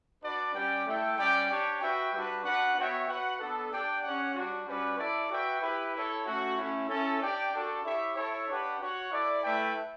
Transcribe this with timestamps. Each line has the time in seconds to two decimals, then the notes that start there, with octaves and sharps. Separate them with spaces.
0.22 D4 F#4 B4 D5
0.54 G3 C#4 G4 D5 G5
0.86 A3 E4 A4 E5 G5
1.17 G3 C#4 G4 D5 G5
1.49 D4 G4 C#5 G5
1.81 F#4 B4 E5 G5
2.13 G3 D4 F#4 B4
2.44 D4 F#4 B4 F#5
2.77 B3 F#4 C#5 E5 G5
3.08 F#4 B4 F#5
3.40 B3 D4 A4
3.72 D4 G4 D5 G5
4.03 C#4 G4 C#5 F#5
4.35 G3 D4 F#4
4.67 G3 C#4 F#4 B4 D5
4.98 E4 A4 D5
5.30 F#4 B4 E5 G5
5.62 E4 G4 B4
5.94 E4 A4 C#5
6.25 A3 C#4 F#4
6.57 A3 C#4 E4
6.89 C#4 E4 A4
7.21 D4 G4 D5 G5
7.52 D4 F#4 A4
7.84 E4 G4 C#5 E5
8.16 E4 A4 C#5
8.48 D4 G4 B4 F#5
8.80 F#4 C#5 F#5
9.11 E4 A4 D5
9.43 A3 E4 B4 E5 G5